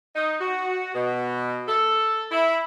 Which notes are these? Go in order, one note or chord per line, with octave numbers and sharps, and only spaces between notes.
D#4
F#4
B2
A4
E4